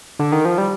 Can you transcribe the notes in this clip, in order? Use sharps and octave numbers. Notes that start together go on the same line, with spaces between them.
D3
D#3
F3
G3